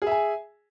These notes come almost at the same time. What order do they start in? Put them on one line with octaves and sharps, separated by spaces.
G#4 E5 G#5